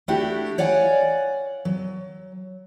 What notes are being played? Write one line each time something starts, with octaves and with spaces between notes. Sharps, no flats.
A3 D4 E4 F#4 G4
C#5 D5 F5 F#5 G#5
F#3